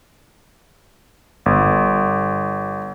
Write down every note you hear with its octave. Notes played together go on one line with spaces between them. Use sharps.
G1